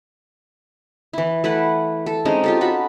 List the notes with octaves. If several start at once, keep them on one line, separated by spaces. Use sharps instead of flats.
E3 E4
A3 E4 B4 F#5
A4
G#3 C4 C#4 D#4
F4 G4 A4
F#4 A4 B5